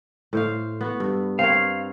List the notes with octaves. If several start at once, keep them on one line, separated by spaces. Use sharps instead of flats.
A2 C5 F5
B3 F#4
G2
C4 A#4 C#5 F5